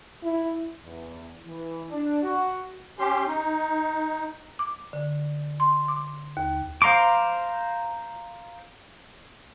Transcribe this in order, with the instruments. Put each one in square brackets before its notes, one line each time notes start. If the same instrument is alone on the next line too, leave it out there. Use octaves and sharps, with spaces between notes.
[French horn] E4
[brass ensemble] E2
E3
D4
F#4
[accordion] C#4 G4 C6
D#4
[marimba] D6
D3
C6
D6
D#2
[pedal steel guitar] C5 F5 A#5 C6 D6